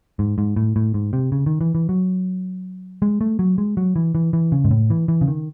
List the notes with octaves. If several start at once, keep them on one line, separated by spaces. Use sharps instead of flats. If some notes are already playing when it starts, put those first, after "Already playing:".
G#2
G#2
A2
A2
G#2
C3
C#3
D#3
E3
E3
F#3
G#3
A3
F#3
G#3
F#3
E3
E3
E3
C#3
G#2
A2
E3
E3
C#3
D#3